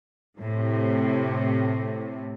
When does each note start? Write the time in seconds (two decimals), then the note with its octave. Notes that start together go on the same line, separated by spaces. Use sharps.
0.39 A2 C3